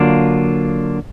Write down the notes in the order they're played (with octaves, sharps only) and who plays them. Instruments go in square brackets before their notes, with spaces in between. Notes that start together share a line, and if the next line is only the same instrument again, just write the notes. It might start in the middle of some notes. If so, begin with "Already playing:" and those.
Already playing: [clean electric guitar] D3 F#3 A#3 D4 F4